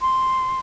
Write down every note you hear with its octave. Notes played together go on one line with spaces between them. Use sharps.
C6